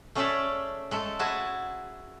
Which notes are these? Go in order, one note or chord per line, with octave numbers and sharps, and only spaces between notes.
A3 C#4 G#4 C#5 D5 E5
G#3 A3 A4
E4 F#4 G#4 G#5 A5